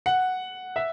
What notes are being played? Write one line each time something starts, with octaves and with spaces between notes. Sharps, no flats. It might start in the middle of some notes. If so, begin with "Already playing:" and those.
F#5
E5